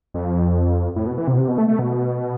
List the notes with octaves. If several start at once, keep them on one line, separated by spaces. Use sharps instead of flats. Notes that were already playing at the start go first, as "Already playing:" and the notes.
F2
A2
B2
E3
C3
B2
C3
B2
A3
A3
B2